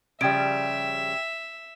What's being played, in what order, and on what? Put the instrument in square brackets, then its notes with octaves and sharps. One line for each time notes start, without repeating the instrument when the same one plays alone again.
[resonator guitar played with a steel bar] C#3 F3 G3 [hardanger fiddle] E5 [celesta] G5 G#6 D7